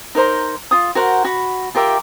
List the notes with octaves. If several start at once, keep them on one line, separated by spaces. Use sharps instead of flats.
D#4 A#4 C5 A#5
F4 D#6
F#4 A#4 C5 F#5
F#4 B5
F4 G4 A#4 E5